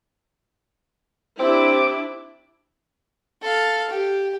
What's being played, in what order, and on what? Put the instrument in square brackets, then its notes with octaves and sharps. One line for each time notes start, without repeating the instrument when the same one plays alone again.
[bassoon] C4 [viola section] D4 E4 G4 [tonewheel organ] D6
[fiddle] A4 F5
G4